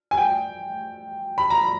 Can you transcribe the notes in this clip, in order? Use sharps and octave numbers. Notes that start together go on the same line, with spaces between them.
G#5
G5
B5
A#5
B5